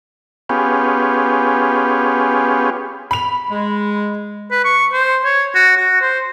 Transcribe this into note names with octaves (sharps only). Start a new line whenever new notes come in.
B3 C#4 F4 G4 G#4
B5 F7
G#3
B4
C#6
C5
C#5
F#4
F#4
C5